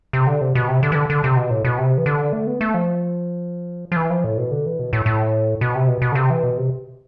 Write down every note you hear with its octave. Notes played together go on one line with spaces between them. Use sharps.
C3
D3
C3
B2
C3
D3
E3
D3
D3
C3
B2
A2
B2
C3
E3
D3
A3
B3
A3
F3
F3
E3
F3
A2
B2
D3
E3
B2
A2
A2
B2
C3
B2
B2
D3
C3
E3
B2
C3